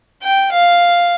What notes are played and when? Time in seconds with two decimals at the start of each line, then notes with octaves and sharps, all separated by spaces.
0.23 G5
0.52 F5